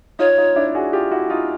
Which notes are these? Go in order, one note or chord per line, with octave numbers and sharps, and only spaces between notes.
D#4 F4 C#5
D#4 F4
D4 E4
F#4 G#4
F4 G4
E4 F#4
D#4 F4